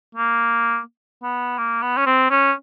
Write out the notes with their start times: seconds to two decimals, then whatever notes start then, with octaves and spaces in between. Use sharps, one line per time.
0.15 A#3
1.23 B3
1.58 A#3
1.82 B3
1.97 C#4
2.06 C4
2.30 C#4